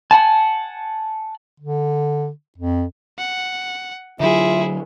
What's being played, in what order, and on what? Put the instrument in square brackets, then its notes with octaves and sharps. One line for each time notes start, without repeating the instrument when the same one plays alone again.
[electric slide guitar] F#5 G#5 A5
[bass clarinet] D3
F2
[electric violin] F#5
[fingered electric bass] D3 F#3 [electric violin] E4 G#4 [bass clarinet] F4 [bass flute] E5